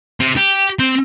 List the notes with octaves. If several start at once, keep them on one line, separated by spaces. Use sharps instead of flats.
C3
G4
C4